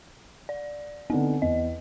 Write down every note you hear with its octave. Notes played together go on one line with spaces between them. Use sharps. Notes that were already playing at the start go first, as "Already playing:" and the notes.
D5
D3 B3 C4 D#4
E2 D#5